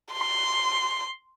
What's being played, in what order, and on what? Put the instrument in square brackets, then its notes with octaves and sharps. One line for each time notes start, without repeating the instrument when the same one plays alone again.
[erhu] C6